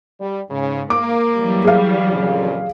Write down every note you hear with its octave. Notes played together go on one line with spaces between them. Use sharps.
G3
G#2 C#3
A#3 D6
E3 F#3 G3
G#4 F5
F2 A#2 C#3